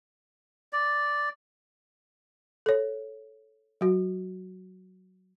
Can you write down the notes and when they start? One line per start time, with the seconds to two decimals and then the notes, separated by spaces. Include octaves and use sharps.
0.73 D5
2.66 A4 C#5
3.81 F#3 F#4